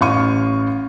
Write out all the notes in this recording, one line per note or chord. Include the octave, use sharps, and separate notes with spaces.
A1 F5 C#6 D#7